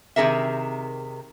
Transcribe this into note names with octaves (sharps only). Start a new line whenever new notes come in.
C3 D#3 C#4 G#4 A#4 E5